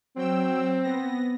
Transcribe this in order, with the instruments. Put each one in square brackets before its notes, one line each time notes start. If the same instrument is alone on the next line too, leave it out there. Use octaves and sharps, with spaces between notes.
[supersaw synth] F#3 G5 E6 [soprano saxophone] C4
[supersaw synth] B3 A#6